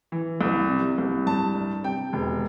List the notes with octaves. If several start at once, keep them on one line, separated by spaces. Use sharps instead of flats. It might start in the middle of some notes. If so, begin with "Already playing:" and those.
E3
C2
C3
C2
G2 A5
G2
C3 G5
E1